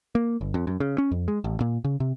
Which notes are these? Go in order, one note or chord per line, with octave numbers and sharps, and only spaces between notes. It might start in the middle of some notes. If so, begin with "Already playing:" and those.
A#3
G1
F2
F#2
C#3
C#4
F2
G#3
A1
A#2
C#3
C3